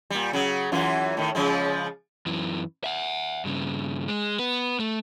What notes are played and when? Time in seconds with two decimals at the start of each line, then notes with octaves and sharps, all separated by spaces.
0.10 A#2 G3
0.33 C#3 F#3
0.72 F#2 E3 F4
1.17 A2 D#3
1.35 C#3 F3 G#3
2.26 F#2 E3
2.84 E5 F#5
3.45 G2 C#3
4.08 G#3
4.39 B3 B4
4.80 A3